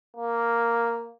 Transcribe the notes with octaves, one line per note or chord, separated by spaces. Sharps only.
A#3